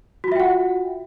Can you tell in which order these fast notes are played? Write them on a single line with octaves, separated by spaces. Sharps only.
F#4 F4 E5 G5 F#5